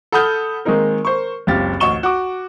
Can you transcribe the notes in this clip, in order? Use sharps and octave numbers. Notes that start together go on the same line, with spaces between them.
A4 F#5 B5 D#6 F6 G6
D#3 G#3 A#3 C4 D#4 A#4
A#4 C5 C#6
F#1 C#2 C4 G4 F6 A6
A1 D2 D#5 C#6 E7 G7
F#4 D6